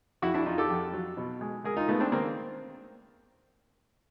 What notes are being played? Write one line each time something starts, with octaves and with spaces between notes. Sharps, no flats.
F2 E4 F#4
D4 E4
F2 D#4 F4
G4 A4
F2
F#3
B2
G#3
G#3 G#4 A#4
D#4 F4
G#3 A3 B3
C4 D4
D#3 A#3 C4